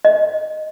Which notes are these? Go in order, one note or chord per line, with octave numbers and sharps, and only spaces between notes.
D#5